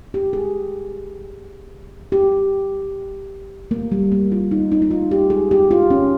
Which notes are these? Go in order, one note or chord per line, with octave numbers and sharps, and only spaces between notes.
G4
G#4
G4
A#3
G3
A#3
F4
D#4
D#4
D#4
F4
G4
G#4
G4
F4
C#4